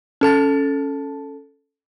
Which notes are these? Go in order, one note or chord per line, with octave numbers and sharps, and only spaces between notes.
C#4 A4 A5 A6